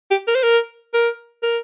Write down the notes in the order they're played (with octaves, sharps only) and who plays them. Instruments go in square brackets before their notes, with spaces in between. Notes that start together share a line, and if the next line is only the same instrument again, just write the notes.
[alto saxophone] G4
A#4
C5
A#4
A#4
A#4